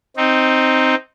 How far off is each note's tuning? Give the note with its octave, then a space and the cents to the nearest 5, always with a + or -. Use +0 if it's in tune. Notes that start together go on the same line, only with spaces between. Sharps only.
C4 +0 D#4 +0